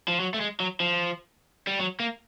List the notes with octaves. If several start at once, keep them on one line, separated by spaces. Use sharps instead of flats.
F3
F#3
A3
G#3
F#3
F3
G3
F#3
A#3